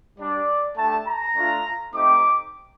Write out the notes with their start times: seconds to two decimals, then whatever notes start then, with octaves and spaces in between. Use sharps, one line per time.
0.19 G3 D4 G4 D5
0.77 A3 D4 G4 A5
1.07 A#5
1.36 A3 D4 F4
1.94 A3 C4 D#4 G4 D6